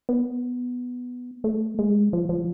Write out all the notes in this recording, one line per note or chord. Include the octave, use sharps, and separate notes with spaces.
B3
A3
G#3
F3
F3